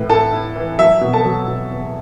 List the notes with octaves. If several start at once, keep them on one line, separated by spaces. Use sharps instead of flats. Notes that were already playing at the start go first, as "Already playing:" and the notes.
Already playing: A2 E3 B4
E4 A4 A5
E4
E3
F#3 E5
B2
A4 A5
F#3
B2
E2